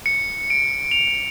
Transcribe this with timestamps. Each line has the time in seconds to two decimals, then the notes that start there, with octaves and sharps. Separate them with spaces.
0.06 C#7
0.50 D7
0.91 F7